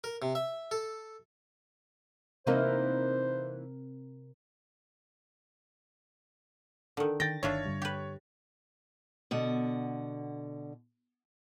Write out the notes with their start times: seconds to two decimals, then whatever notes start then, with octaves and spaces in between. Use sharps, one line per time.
0.04 A#4
0.22 C3
0.35 E5
0.71 A4
2.47 C3 E3 A#3 C4 D#4 A#4 C5
6.97 D3 D#3
7.20 D#3 G5 A6 A#6
7.43 G1 D#3 D4 F4 C#5 E5
7.65 G2 D3 G3
7.82 G4 B4
9.31 B2 D3 F#5